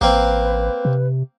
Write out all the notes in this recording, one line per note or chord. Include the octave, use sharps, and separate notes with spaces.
A1 A#3 C4 B4
C3